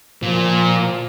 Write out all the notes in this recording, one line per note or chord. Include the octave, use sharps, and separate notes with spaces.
A#2 F3